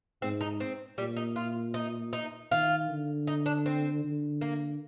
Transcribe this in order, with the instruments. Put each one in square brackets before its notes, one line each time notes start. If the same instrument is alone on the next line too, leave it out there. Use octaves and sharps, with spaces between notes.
[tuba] G#2 [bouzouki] C4
[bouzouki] D#4
C4
[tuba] A#2 [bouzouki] G3
[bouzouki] D#4
F4
D#4
D#4
[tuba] D#3 [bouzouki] F4
[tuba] D3
[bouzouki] D#4
D4
C4
[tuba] D3
[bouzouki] A#3